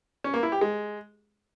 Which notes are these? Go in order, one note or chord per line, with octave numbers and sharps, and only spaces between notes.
C#4
A#3
E4
G4
G#3